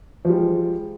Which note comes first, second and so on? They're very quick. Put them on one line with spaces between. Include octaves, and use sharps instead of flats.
F3 G3 G#3